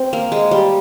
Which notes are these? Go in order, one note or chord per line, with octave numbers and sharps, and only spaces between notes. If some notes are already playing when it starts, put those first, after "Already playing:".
Already playing: C4
A#3
G#3
G3